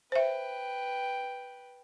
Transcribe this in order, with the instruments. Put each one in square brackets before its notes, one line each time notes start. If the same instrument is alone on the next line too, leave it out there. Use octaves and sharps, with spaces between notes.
[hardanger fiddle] B4 G5 [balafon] C5 E5